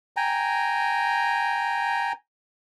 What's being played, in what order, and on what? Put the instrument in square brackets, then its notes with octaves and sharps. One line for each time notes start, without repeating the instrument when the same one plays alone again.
[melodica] G5 G#5 A#5